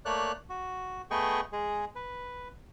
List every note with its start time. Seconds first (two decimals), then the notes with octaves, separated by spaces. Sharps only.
0.05 A3 A#3 C#5 D5 F#6
0.49 F#4
1.11 A3 B3 G#4 D#5 G5 C#6
1.52 G#3 G#4
1.96 B4